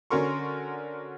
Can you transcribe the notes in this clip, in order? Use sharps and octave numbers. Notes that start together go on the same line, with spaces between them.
D3 C#4 F#4 A#4 C6 C#6